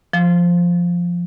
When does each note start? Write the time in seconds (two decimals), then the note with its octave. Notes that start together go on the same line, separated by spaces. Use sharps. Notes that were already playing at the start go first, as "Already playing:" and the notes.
0.13 F3